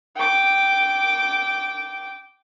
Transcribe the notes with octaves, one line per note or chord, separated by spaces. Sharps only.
G5 D6